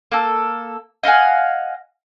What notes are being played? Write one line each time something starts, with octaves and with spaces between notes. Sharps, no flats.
A#3 A4
D#5 F5 F#5 G#5